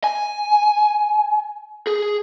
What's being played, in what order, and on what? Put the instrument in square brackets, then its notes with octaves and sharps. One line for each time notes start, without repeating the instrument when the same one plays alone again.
[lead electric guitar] G#5
G#4